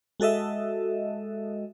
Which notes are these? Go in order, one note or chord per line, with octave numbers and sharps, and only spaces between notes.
G#3 F#4 A4 D#5 E5